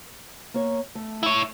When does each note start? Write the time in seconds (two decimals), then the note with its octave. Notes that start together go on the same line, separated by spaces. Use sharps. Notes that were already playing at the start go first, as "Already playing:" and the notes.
0.54 A#3 C#5
0.95 A3
1.23 E4 C#5